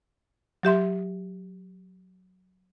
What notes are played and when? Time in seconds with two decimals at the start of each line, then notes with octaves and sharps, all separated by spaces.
0.63 F#3 G4 E5 C6